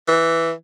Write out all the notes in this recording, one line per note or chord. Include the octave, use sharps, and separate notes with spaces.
E3